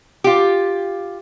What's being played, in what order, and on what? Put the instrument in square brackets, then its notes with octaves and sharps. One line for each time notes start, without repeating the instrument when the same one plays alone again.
[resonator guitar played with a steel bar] F4 G4